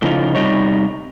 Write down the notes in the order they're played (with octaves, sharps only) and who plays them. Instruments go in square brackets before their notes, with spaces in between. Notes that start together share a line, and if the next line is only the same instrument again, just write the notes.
[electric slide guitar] A2 C#3 F3 D#4 F4
C3 G3 D#4 C#5